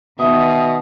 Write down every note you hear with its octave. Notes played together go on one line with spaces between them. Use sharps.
B2 D#3 B3 E5 D#6